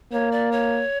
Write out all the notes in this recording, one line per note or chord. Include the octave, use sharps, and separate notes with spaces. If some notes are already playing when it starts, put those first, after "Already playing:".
A#3 C#5
D5
C#5